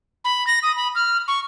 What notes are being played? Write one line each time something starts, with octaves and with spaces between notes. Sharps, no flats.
B5
A#6
D#6
B5
F6
C#6